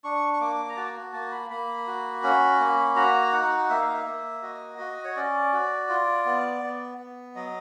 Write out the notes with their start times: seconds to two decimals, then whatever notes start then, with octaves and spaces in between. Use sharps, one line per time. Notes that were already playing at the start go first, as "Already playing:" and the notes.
0.04 D4 C#6
0.33 C#6
0.40 A#3 D6
0.69 A#5
0.76 F#4 A5
1.13 A#3 A5
1.31 B5
1.50 A#3 B5
1.87 F#4
2.23 C#4
2.60 A#3
2.96 F#4 A#5
3.32 D#4 F#5
3.70 A#3 E5
3.81 F5
3.93 E5
4.06 A#3
4.42 F#4 D#5
4.78 F#4
5.04 C#5
5.16 C#4 D5
5.53 F#4
5.89 F4
6.25 B3
6.62 B3
6.98 B3
7.35 F#3 D#5